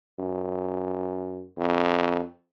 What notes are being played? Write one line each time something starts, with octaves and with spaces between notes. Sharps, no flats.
F#2
F2